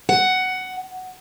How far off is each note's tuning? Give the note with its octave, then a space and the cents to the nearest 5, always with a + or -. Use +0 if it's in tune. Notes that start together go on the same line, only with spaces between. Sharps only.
F#5 +10